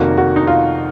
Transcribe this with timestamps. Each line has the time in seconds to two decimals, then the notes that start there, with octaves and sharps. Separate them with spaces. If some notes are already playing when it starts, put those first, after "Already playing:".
Already playing: F1 F2 D#3 A#3 F#4
0.18 F#4
0.36 D#4
0.47 F4